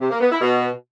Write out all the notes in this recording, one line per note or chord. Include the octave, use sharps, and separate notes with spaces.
C3
A#3
B3
E4
B2